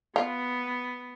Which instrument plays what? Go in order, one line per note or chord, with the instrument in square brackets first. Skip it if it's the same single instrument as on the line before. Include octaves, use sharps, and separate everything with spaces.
[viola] B3 [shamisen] F4